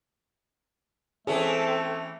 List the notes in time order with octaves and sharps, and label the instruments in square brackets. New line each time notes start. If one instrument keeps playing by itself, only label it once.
[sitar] E3 C#4 [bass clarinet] A3 [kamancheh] C4 A4 [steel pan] G#4